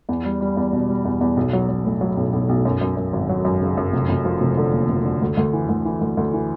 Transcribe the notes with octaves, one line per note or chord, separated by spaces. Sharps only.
E2
G3
G3
E2
B2
G3
E2
E2
B1
F#3
F#3
A2
F#3
B1
B1
B1
F#2
F#2
F#2
G#1
F#3
F#2
C#3
F#2
F1
F1
F3
F1
D3
D#2
F1
D3
D2
D2
E3
D2
E3
D2
D2
E3